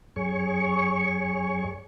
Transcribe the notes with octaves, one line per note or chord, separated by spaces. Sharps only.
F#2 G#4 C#5 C#6